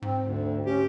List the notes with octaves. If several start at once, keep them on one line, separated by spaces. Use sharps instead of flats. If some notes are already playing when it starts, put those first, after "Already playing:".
G#2 C4
D2
C#4 G4